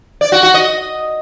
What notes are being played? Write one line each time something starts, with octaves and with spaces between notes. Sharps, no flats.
D5
F#4
F#4
D#5